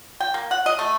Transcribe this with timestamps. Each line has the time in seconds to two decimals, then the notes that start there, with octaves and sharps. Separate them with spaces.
0.20 G5
0.34 A#3
0.51 F#5
0.66 D#5
0.79 A3